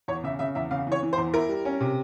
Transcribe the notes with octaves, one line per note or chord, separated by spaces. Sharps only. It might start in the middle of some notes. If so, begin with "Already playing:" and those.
E2 C#5
C#3 E5
C#3 E5
E2 E5
C#3 F5
E3
C#5
E3
C5
E2
E4 A#4
G3
C#4
C3